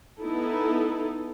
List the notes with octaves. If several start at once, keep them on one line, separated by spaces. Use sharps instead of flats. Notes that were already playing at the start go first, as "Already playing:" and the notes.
B3 D#4 E4 A4